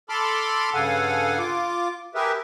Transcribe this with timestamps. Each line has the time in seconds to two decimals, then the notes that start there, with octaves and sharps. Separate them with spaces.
0.09 A4 A5 B5 C6 D6 F6
0.74 G2 C#3 A4 F5 F#5 G#5
1.39 F4 D6
2.15 G4 G#4 A#4 B4 E5